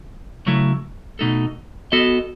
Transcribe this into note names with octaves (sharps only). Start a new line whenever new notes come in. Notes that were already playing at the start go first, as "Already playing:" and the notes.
C#3 F#3 A3 E4
B2 A3 D#4 A4
B3 F#4 A4 D#5